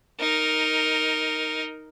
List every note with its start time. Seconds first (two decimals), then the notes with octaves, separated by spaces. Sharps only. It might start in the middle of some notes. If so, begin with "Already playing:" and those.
0.20 D#4 A#4